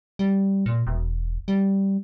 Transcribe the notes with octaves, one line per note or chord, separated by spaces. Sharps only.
G3
A#2
E1
G3